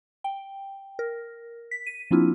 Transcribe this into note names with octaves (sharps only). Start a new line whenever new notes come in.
G5
A#4
B6
D#7
F3 A#3 C4 D4 E4 F4